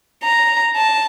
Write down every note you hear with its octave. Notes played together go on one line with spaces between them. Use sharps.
A#5
A5